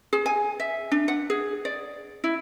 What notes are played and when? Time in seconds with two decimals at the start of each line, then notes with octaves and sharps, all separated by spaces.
0.13 G#4
0.26 G#5
0.60 E5
0.91 D4
1.08 F#5
1.30 G#4
1.65 D5
2.24 E4